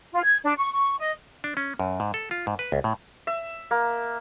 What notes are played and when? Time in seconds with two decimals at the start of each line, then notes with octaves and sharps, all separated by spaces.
0.13 F4
0.24 G#6
0.44 D4
0.57 C#6
0.72 C#6
0.99 D#5
1.44 D4
1.57 C#4
1.80 F#2
2.00 G#2
2.14 A4
2.31 F4
2.47 G#2
2.59 B4
2.72 C#2
2.84 A2
3.27 E5
3.71 A#3